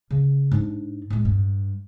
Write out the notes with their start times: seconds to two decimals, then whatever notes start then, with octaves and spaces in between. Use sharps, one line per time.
0.11 C#3
0.52 G#2 D4
1.10 A2 G#3
1.25 G2